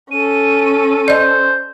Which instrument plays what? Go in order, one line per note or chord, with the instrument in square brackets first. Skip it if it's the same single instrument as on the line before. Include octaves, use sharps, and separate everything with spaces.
[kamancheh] C#4 A4 [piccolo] D#7
[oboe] C5 [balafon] D5 D#5